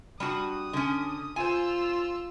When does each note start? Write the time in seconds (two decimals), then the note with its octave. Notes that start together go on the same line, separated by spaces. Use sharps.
0.20 G3 D4 F#4 D#6
0.73 D3 C#4
1.36 F4 C5 G#5 E6